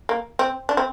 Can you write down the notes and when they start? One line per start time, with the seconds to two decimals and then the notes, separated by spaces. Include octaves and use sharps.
0.09 A#3
0.39 C4
0.69 D4
0.77 C4